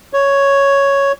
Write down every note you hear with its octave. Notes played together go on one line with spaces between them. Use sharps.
C#5